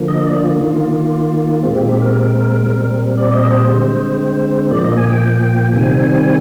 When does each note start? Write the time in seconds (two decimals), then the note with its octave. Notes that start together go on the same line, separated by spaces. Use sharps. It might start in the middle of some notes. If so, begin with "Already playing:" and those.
Already playing: D3 F3 A#3
0.08 D#5
0.26 D5
0.43 F4
0.60 D#3 A#3 F4
1.63 A#2 G#3 C4 F4
1.76 G4
1.89 G4
2.02 A#4
2.66 A#2 G3 C4
3.17 D5
3.33 D#5
3.51 C5
3.68 D3 G#3 C4
4.71 A#2 F3 A#3 D5
4.84 D#5
4.97 G#5
5.09 G5
5.73 C3 D#3 G3 C4 G#5